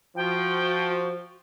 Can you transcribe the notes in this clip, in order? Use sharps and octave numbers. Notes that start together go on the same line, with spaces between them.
F3 F#4 G5